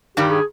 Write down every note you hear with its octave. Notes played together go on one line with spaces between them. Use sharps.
G2 D#3 G3 G4
G#4